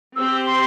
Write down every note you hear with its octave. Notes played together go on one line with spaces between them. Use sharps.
C4 G4 C5 E6
C6